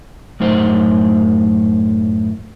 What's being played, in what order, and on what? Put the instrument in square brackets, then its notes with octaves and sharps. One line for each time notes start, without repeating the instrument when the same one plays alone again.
[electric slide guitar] F#2 A2 D#4 C5